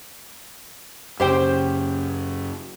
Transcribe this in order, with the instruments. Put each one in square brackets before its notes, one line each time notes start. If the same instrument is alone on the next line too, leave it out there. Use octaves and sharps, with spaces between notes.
[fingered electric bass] F#2 C#3 [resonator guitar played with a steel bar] G4 C5 G5